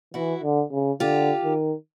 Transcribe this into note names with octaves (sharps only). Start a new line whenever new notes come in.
E3 E4 F#4
D3
C#3
D3 F4 G4
D#3